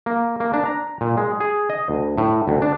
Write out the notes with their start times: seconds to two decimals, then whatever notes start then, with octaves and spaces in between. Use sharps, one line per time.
0.06 A#3
0.40 A#3
0.53 D4
0.65 A#5
1.01 A#2
1.17 G#3
1.40 G#4
1.70 D#5
1.89 D2
2.18 A2
2.48 D2
2.62 D4